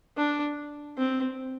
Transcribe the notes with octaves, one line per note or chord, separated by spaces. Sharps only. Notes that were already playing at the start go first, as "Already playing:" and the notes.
D4
C4